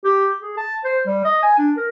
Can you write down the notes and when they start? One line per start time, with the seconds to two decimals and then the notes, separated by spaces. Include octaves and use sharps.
0.05 G4
0.41 G#4
0.57 A5
0.84 C5
1.07 G3
1.25 D#5
1.43 G#5
1.58 D4
1.77 A#4